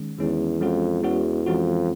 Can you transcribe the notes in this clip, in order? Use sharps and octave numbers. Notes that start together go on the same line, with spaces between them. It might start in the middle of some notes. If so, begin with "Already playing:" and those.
Already playing: D#3 G#3 C#4
E2 D#3 G#3 C#4
F2 E3 G#3 C#4 F#4
E2 E3 G#3 C#4 F#4
F2 E3 G#3 C#4 F#4